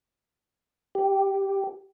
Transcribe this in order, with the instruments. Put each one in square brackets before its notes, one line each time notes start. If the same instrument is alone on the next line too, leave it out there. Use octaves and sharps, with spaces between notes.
[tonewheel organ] G4